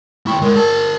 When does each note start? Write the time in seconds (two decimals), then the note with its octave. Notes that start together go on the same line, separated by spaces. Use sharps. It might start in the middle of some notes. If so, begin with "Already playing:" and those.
0.27 D#2 E4 G5 C6 C#6
0.42 G#3 E4 A#4 C#5
0.56 G#4 A#4 D5 G#5 A5